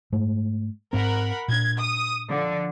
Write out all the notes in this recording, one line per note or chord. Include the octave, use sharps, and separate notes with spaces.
G#2 G#3 A3
G#2 C4 A#4 F#5 B5
A#2 D4 G#6
D#6
D3 F3